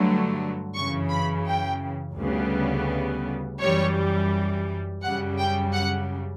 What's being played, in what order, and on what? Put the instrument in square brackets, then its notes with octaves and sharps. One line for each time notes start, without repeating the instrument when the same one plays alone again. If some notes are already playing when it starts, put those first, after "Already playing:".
Already playing: [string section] G2 D3 F#3 A3
F#2 C#3 E3 C#6
B5
G5
D2 C#3 G3 B3
F#2 E3 G3 C#5
F#2 C#3 G3 F#5
G5
F#5